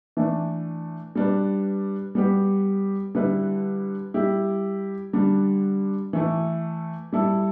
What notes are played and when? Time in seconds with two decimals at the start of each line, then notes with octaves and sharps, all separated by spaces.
0.17 E3 A3 D4
1.15 G3 D4 B4
2.15 G3 B3 G4
3.15 D3 G3 E4 B4
4.14 G3 E4 G4
5.13 D3 G3 D4
6.13 E3 A3 E4
7.13 G3 E4 A4